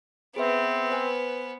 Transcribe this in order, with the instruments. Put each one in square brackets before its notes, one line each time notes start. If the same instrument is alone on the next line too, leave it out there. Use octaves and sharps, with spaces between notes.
[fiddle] B3 [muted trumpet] C4 [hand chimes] G#4 B4 E5
[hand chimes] B4 C5 G#5